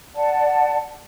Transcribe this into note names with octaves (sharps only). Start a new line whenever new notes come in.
D5 F#5 A5